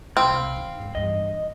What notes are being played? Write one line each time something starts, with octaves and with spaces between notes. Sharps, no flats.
E1 C2 C4 F5 B5 F6
D#3
G#2 D3
E2 G2 D#5